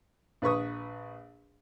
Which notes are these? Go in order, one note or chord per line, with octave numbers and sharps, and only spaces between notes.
A#1 B4 C#6 D#6